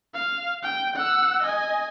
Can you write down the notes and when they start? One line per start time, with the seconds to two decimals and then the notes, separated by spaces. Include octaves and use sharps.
0.14 F5
0.63 G5
0.96 F#5 E6
1.42 D#5 G#5